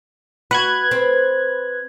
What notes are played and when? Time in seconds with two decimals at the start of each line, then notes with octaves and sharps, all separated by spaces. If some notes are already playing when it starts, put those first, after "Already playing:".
0.51 F#4 B4 F#6 G#6
0.91 C4